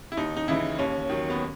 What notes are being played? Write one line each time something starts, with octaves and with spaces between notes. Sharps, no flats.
E4
D#2 D#4
D#4
C#3 E3 E4
D#2 C#4
D#3 F#3
B3